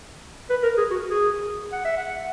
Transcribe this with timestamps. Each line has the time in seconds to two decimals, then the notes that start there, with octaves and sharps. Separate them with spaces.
0.50 B4
0.63 A#4
0.77 G#4
0.91 F#4
1.10 G#4
1.72 F#5
1.85 E5
1.97 F#5